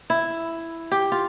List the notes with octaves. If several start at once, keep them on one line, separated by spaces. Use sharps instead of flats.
E4
G4
F4